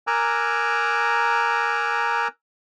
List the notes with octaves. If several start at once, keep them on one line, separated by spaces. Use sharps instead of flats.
A#4 G#5 A#5 D6 E6 F#6